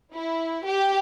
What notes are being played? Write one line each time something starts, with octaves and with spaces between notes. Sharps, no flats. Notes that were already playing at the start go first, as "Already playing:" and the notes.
E4
G4